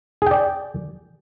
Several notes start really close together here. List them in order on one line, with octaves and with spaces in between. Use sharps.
G#4 G5 D5